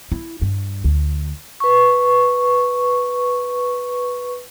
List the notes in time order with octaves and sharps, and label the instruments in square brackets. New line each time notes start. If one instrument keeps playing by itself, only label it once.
[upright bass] E4
G2
D2
[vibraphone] B4 C#6